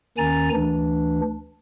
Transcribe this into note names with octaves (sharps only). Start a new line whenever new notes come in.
D#2 D#3 C#4 G#5 A#5 A6
D2 E3 D4